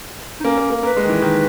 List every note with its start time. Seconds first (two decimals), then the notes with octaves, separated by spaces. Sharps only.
0.40 D#4
0.44 A#3 C#4
0.58 A#3
0.70 A#3
0.83 A#3 B4
0.97 G#3
1.05 D#3
1.10 E3
1.22 D#3